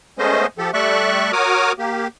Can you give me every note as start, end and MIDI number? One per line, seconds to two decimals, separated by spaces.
0.19 0.46 56
0.19 0.46 57
0.19 0.46 59
0.19 0.46 61
0.19 0.46 72
0.19 0.46 75
0.58 0.71 53
0.58 0.71 67
0.58 0.71 69
0.74 1.32 55
0.74 1.32 57
0.74 1.32 74
0.74 1.32 76
0.74 1.32 85
0.74 1.32 90
1.33 1.72 66
1.33 1.72 70
1.33 1.72 73
1.33 1.72 86
1.33 1.72 87
1.33 1.72 89
1.79 2.07 58
1.79 2.07 67